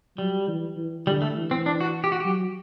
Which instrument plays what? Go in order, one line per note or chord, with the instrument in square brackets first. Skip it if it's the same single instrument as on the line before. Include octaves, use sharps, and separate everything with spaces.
[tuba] F#3 [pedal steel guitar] G3
[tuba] E3
E3
[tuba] D3 [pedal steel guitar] G3
[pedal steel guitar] A3
[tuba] E3
[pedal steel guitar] C4
D4
F#4
G4
F#4
[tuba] F#3 [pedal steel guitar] G4